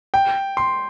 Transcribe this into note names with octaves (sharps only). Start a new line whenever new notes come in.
G5
C6